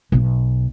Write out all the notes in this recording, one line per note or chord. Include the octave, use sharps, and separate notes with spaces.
B1